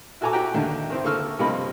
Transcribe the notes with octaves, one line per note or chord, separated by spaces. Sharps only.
E4 F#4 A4 G#5 A#5 D6
E4 F#4 G4 E5 G5 A#5
D#2 D3 A#3 D4 D#4
D#3 C4 E4
D3 A#3 A4 C#6 E6 F6
G2 C3 F3 A#3 D#5 B5